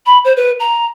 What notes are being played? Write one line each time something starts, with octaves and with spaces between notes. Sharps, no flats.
B5
C5
B4
A#5